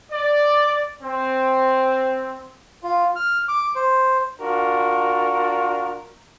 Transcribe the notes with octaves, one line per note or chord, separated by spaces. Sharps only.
D5
C4
F4
F6
D6
C5
D4 F4 F#4 A#4